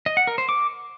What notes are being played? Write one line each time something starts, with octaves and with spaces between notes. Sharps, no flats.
D#5
F#5
A#4
C5
D6